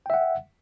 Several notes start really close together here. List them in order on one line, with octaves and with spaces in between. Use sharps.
G5 E5 F#5